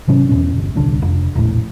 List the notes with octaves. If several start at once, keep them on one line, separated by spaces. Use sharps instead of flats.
G#2 C3 F#3 C#4
E2 B2 C#4
G1
D#1 C2 D3 D4
F1
E1 A#1 A2